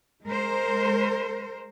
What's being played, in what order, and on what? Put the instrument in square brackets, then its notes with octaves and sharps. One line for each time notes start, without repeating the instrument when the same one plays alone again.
[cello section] G#3 A#4 C5